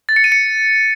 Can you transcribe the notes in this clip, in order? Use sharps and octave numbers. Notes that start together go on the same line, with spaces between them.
A6
C#7
D#7
C#7